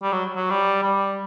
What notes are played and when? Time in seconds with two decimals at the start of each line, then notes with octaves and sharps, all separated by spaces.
0.03 G3
0.13 F#3
0.36 F#3
0.50 G3
0.83 G3